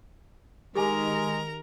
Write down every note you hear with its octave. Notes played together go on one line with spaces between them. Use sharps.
D#3 G#3 G4 G#4 A#4 G#5 A#5